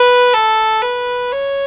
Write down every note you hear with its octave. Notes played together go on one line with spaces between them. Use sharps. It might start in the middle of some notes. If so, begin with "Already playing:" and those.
Already playing: B4
A4
B4
C#5